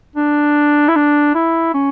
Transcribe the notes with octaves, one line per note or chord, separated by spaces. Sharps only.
D4
E4
D4
E4
C#4